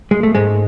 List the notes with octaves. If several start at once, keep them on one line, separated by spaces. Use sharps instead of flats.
G#3
A3
G#2 G#3